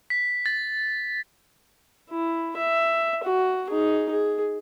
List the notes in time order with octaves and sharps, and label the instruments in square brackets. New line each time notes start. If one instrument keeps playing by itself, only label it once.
[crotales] B6
A6
[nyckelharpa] E4
E5
F#4
D#4 G#4
G#4